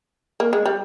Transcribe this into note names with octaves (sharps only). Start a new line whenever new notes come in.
A#3
G#3
G3